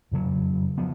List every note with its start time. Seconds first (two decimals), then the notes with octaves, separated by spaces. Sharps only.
0.12 F2 C#3 F#3
0.78 F3 B3